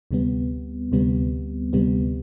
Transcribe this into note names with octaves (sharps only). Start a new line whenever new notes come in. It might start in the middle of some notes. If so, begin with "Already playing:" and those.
D2 C3 G3 B3
D2 C3 G3 B3
D2 C3 G3 B3